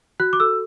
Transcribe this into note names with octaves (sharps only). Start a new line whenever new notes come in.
F#4 F#6
D6
A4 E6